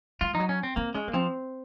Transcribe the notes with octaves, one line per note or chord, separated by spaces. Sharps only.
G#3 F4
F3 D#4
F#3
C#4
C4
A#3 C4
G#3 C#4
A#3
F3 C4